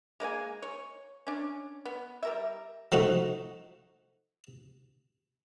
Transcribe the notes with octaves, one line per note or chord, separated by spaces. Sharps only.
G#3 A#3 D5 G#5
C#5
C#4 D4
B3
G3 A#4 E5
F3 A3 D#4 F#4